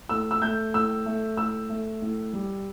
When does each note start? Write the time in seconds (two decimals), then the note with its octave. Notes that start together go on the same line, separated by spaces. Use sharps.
0.09 A2 E6
0.31 E6
0.41 A3 G6
0.74 A2 E6
1.06 A3
1.37 A2 E6
1.69 A3
2.02 A2
2.33 G3